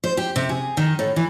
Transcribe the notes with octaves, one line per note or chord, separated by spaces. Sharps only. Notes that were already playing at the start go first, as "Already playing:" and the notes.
C5
G4
C3
G#4
D#3
A2
E3